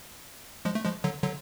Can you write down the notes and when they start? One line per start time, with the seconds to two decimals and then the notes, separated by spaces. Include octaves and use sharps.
0.65 F3 G#3
0.75 A3
0.84 F3 G#3
1.04 D3 F#3
1.24 D3 F#3